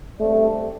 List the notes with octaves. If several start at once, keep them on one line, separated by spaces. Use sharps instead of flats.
G2 G3 A3 C4 A4 D5